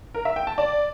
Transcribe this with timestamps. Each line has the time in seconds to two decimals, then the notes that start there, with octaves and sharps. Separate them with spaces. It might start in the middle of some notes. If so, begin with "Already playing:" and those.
0.14 A#4
0.25 E5
0.36 G5
0.47 A5
0.58 D5